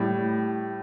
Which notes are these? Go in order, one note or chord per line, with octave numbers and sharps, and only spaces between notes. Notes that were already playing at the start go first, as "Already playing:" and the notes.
Already playing: A2 G3